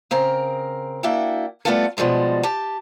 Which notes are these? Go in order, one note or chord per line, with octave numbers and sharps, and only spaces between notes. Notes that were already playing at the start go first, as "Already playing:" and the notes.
C#3 C4 A#4 A#5
A#3 D4 E4 F#4 E5 G5
G3 A3 B3 E4 F4 A4
B2 F3 G3 G#3 A4
G4 A5